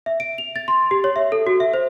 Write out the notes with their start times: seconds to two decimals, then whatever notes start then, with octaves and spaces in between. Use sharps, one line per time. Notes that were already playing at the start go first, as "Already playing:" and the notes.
0.06 E5
0.20 D7
0.38 F7
0.56 A6
0.68 C6
0.91 G4
1.04 C#5
1.16 E5
1.32 A4
1.47 F#4
1.60 E5
1.74 C5